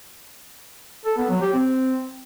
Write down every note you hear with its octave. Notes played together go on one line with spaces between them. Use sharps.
A4
B3
F#3
G4
C4